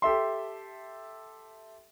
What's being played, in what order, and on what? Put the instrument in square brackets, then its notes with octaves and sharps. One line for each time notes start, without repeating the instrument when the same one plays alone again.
[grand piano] G4 A4 E5 C6